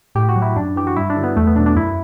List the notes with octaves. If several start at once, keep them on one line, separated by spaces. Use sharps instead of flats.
A2 G4
F#4
F#3
E4
F#2 D4
E3 G4
F#4
G2 E4
D4
D3 F#3
B3
E2 A3
B3
B2 F#3 D4
D4
F#2 E4